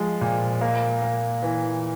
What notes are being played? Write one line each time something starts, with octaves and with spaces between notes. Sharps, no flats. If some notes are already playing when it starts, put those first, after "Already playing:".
Already playing: F3 G#3
A#2
A#3
A#3
E3